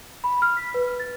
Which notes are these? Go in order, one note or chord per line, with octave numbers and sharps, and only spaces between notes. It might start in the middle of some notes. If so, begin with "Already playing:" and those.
B5
F6
B6
B4
A6